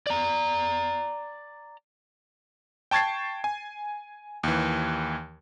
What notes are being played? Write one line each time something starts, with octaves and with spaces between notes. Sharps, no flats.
D5 A#5
G5 A5 C#6 G#6 A6 C7
G#5
D#2 E3